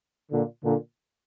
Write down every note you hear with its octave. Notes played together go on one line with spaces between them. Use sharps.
A#2 D3
A#2 D3